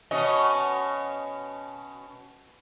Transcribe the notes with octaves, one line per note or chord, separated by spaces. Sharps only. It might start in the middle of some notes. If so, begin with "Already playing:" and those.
B2 C#4 D#5